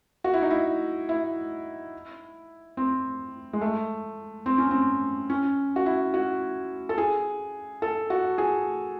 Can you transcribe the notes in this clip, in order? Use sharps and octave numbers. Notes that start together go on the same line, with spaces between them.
F#4
E4
D#4
E4
E4
C4
G#3
A3
C4
C#4
C4
C#4
F#4
E4
F#4
A4
G#4
A4
F#4
G#4